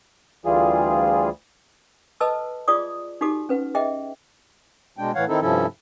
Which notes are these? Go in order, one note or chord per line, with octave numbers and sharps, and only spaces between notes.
D2 E3 G3 F4 G#4
A4 B4 D#5 A5 E6
F4 G#4 D5 D6 D#6
D#4 F#4 G4 A4 D6
C#4 B4 F#5
G#4 D#5 E5 G5
B2 G#3 D4 G5
A2 E3 C#5 F5 F#5
D#3 C4 D#4 E4 A4
G2 C3 F3 C#4 E4 A4